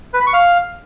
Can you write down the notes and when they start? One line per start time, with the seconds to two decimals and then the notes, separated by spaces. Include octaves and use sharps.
0.14 B4
0.20 B5
0.27 C#6
0.33 F5